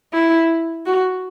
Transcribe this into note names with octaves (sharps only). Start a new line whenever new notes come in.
E4
F#4